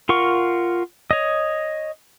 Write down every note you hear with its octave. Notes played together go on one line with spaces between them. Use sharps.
F4 A#4 F#5 C#6
C#5 D#5